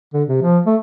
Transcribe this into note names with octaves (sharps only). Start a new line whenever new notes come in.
D3
C3
F3
A3